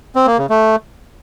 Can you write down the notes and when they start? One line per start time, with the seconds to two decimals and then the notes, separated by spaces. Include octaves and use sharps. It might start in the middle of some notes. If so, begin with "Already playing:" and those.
0.15 C4
0.27 A#3
0.38 C#3
0.50 A3